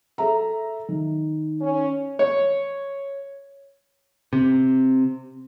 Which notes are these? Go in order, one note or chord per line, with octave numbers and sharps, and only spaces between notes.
A4 E5 A#5
D#3
C#4
C#5
C3